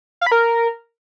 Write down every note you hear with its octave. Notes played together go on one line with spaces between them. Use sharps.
F5
B5
A#4